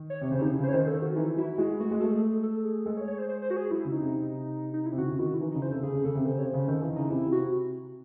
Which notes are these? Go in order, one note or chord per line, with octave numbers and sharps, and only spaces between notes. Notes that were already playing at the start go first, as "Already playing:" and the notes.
Already playing: D#3
C#5
C3
C#3 C5
C3
C#3 D#4
E4
C#3 C5
C#5
D#3 C5
A4
F#4
E3 D#4
F#3 E4
G#3 F#4
A3 F#4
G#3
A3 A4
G#4
A4
A4
G#4
G#3 A4
C#5
C#5
C5
C5
C5
F#4
G#4
F#3 E4
C#3
D#4
C3
D#4
E4
C3
C#3 F#4
C#3
D#3 E4
F#4
E4
E3 D#4
C#3 D#4
C5
C3 A4
C#3 G#4
C#3
C#3 A4
C3
C#3 C5
C3 C#5
C5
C#3
D#3 A4
E3 D#4
C#3 D#4
C3 E4
C3
F#4